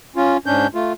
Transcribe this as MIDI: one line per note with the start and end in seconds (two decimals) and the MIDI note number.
0.16 0.37 61
0.16 0.37 65
0.46 0.67 44
0.46 0.67 61
0.46 0.67 62
0.46 0.67 91
0.75 0.93 57
0.75 0.93 65